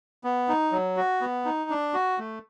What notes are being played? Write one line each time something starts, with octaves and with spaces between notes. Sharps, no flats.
B3
D#4
F#3
F#4
B3
D#4
D4
F#4
A3